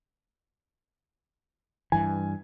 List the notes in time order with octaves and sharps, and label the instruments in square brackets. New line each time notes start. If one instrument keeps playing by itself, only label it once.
[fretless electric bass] G2 E3 [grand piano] G#5